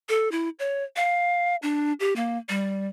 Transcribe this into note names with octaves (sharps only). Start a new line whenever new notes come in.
A4
E4
C#5
F5
D4
G4
A#3
G3